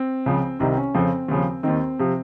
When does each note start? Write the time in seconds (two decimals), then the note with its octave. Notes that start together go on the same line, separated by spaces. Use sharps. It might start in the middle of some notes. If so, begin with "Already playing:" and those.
Already playing: C4
0.26 C#2 C#3 F3
0.59 C2 C3 D#3 C4
0.77 C#4
0.94 F2 C#3 F3 C4
1.28 D#2 C#3 F3
1.63 D#2 D#3 C4
1.99 C3 F3